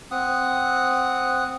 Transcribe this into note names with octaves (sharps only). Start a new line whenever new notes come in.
C4 F#5 D#6